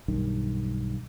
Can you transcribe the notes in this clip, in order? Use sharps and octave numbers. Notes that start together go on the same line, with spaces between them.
B1 G2 D#3